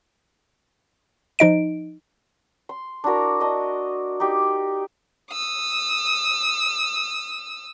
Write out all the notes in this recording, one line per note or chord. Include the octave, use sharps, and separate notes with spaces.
F3 D#4 D#5 D7
C6
D4 E4 F#4 A#4
D4 D#5 D#6
D#4 G4
D#6 E6